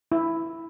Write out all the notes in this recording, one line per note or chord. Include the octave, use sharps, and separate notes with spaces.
E4